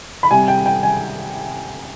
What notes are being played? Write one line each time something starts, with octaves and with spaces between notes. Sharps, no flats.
B5
C3 G3 G#5
G5
G5
G#5